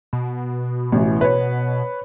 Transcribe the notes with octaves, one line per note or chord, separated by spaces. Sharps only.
B2
A1 E3
B4 C#5